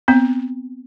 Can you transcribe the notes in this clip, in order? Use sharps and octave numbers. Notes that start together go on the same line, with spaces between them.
B3 C4